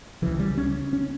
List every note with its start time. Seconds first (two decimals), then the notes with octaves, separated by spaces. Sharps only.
0.22 C#2 C#3 E3
0.39 G3
0.58 C#4
0.93 C#4